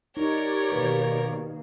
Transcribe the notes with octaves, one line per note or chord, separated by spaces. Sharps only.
D#4 G4 A#4 C#5 D5
B2 D#3 A#3 B4